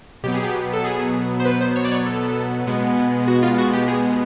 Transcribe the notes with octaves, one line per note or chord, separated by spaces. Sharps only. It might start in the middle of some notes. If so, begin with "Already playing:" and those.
B2 F#3 B3 G4
G#4
G4
A4
G#4
C5
B4
C5
C#5
D5
C#5
A4
B2 G#3 B3
F#4
F4
F#4
G4
G#4